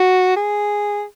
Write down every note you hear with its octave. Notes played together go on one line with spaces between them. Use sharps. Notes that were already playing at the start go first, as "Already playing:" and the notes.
Already playing: F#4
G#4